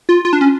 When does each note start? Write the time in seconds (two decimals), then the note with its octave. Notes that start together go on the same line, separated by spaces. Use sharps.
0.09 F4
0.25 F4
0.33 D4
0.41 C#4